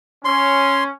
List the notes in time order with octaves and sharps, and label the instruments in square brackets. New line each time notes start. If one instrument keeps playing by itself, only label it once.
[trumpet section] C#4 [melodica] C6